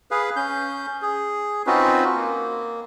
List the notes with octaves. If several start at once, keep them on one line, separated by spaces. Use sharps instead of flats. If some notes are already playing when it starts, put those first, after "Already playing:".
G#4 B4 F5
C#4 G6
G#4
C4 C#4 D#4 F4 F#4 B4
A#3